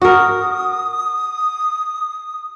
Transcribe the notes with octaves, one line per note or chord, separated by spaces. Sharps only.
F#4 A#4 D#6